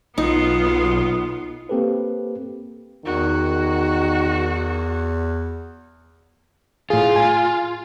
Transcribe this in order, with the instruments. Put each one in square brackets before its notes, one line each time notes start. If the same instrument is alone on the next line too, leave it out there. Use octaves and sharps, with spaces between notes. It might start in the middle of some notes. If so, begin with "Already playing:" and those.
[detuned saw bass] B1 [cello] B3 F4 [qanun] D#4
[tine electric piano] A#3 C4 G4 A4 B4
[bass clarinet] E2 [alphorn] D#3 [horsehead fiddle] F#4
[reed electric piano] A2 G#4 [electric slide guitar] F4
[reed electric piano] G#5